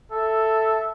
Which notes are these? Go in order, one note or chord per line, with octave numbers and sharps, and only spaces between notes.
A4 E5